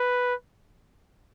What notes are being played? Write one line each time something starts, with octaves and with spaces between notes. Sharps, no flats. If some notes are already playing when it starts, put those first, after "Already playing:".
Already playing: B4